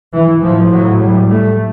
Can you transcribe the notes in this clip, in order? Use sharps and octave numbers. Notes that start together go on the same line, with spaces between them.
E3
A2 F3
F#3
G3
A3